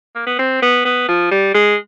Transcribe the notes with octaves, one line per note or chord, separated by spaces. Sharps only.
A#3
B3
C4
B3
B3
F3
G3
G#3